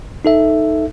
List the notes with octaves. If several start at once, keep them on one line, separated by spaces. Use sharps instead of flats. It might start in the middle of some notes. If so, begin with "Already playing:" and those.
D#4 A4 E5